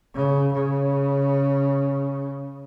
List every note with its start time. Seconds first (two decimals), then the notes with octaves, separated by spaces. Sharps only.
0.14 C#3
0.53 C#3